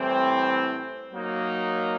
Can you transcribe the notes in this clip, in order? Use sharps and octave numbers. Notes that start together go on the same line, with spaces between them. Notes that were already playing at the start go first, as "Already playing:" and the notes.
Already playing: A2 E3 G3 C4
F#3 A#3 D#4